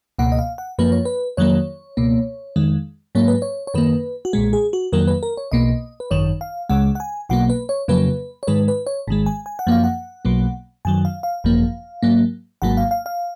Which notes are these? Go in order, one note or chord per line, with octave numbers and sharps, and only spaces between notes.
C#2 B2 A#3 F#5
D#5
F5
F#5
F#2 F3 A#3 B4
C#5
B4
F2 D#3 F#3 A#3 C#5
C#2 B2 A#3
F2 D#3 G#3
G#2 F#3 A#3 C#5
B4
C#5
C#5
F#2 D#3 A#3 B4
F#4
B1 A#2 G#3 G#4
G#4
F#4
F2 D#3 F#3 A#3 A#4
B4
A#4
C#5
B1 B2 A#3 D#5
B4
G#1 F#2 D#3 C#5
F5
C#2 C#3 G#3 F#5
F#5
G#5
B1 B2 F#3 A#3 F#5
B4
C#5
F2 C#3 F#3 A#3 B4
C#5
G#2 D#3 G#3 B4
B4
C#5
G#1 G#2 D#3 G#3
G#5
G#5
F#5
F#2 F3 A#3 F5
F#5
B1 B2 F#3 A#3
F#2 D#3 F#3 G#5
F5
F5
G#1 F#2 F3 A#3
G#2 F#3 A#3
G#1 G#2 F#3 A#3 F#5
F5
F5
F5